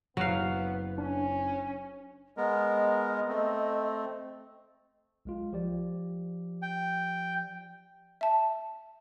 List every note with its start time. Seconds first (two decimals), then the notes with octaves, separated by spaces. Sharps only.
0.17 F#1 F#3 B3 F5 F#6
0.98 C#4 D4
2.37 G#3 B3 A#4 D#5
3.28 A3 C4
5.25 B1 G#3 F4
5.53 F3 G4 D5
6.62 G5
8.21 E5 A5